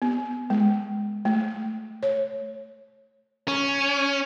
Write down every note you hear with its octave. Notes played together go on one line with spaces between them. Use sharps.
B3
G#3
A3
C#5
C#4